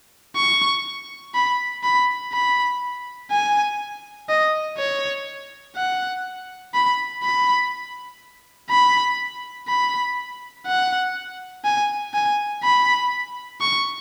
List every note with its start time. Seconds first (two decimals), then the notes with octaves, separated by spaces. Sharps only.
0.36 C#6
1.34 B5
1.84 B5
2.33 B5
3.31 G#5
4.29 D#5
4.78 C#5
5.76 F#5
6.74 B5
7.23 B5
8.70 B5
9.68 B5
10.67 F#5
11.65 G#5
12.14 G#5
12.63 B5
13.61 C#6